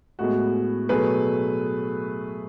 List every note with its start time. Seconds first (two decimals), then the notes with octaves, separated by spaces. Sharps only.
0.19 A2 G#3 B3 F#4
0.89 B2 F#3 A3 G#4 B4